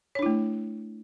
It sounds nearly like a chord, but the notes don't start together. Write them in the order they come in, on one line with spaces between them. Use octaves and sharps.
C#5 D4 E4 A3